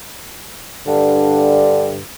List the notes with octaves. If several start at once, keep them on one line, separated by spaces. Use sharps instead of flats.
G2 D3